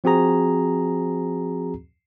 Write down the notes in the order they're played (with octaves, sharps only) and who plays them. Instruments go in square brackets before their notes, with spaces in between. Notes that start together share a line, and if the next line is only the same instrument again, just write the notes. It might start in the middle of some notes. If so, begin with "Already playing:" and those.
[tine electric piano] F3 C4 F#4 G#4 A#5